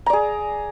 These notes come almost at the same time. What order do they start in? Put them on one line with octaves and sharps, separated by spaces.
A#5 D5 G#4